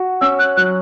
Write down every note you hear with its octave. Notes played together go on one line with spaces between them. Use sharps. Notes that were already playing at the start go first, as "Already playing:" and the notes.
Already playing: F#4
C#4 E6
F#6
F#3 F#6